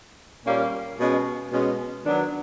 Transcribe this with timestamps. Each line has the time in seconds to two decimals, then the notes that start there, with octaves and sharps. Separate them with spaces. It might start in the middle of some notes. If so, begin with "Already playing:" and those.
0.45 A#2 G3 A#3 C#4
0.98 B2 G#3 C#4
1.51 B2 G#3 C#4
2.05 D#3 F#3 B3 D4